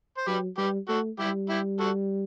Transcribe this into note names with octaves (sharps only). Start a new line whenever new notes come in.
C5
F#3 G4 B4
G3 G4 B4
A3 F#4 A4
G3 E4 G4
E4 G4
F#4 A4